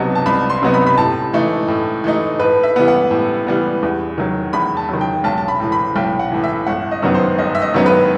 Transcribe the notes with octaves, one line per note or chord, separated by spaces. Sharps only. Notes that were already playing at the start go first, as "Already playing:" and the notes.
Already playing: C2 C3 F#3 B3 D#4 A5
A5
C2 B5
C6
C3 F#3 B3 D#4
B5
B5
A2 A5
E3 A3 D#4
A2
E3 A3 D#4
A2 B4
E5
E3 G3 B3
F#5
A2
E3 G3 B3
E2
D#3 F#3
E2 B5
A5
D#3 F#3
G5
B1 A5
A5
B5
A2 E3
B5
B1 G5
F#5
A2 E3
E5
G1 F#5
D#5
F#2 D#3 F#3 B3
C5
G1 D#5
E5
D#5
F#2 D#3 F#3 B3
B4